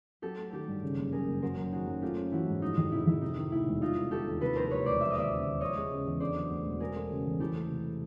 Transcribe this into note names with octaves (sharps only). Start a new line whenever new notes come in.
F#3 G4 A4
A3
D#3 G4 A4
G2
C#3
F#1
F#2 G#4 A#4
F#1
F#3 A#4 C5
F#2
D#3 F#4 G#4
F#2
A3 F4 G4
C#4
E3 E4 F#4
G#2
F3 D#4
F2
C3 E4
F2 E4
C3 D#4
D#3
D2 E4
E1
G3 D#4 F4
B3
D3 G4 A4
D#2
C3 A4 B4
F3 A#4 C5
D2 B4 C#5
E1 C5 D5
F3 E5
D#5
D#2 D5 E5
C#3
D#2
F3 C#5 D#5
G#3
C#3
E2
D3 C5 D5
F#3
D2
E1
F#3 G#4 A#4
A3
C#3
E2
E3 G4 A4
A3
C3